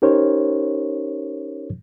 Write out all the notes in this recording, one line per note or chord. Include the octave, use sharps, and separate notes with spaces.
C#4 D#4 G4 A#4 C5 C#5